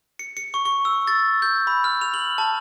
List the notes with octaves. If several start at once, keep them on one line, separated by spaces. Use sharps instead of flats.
C#7
C#7
C#6
C#6
E6
A6
G6
B5
F6
F7
F#7
A5